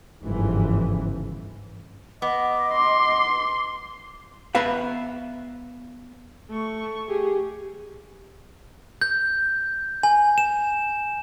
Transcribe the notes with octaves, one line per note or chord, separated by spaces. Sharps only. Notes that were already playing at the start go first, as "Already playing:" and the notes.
G1 C#2 G#2 C#3 E3 F3
B3 D#5 D6
C6
B3 B4 E5 F5
A3 C#6
G4 G#4
G6
G#5
E7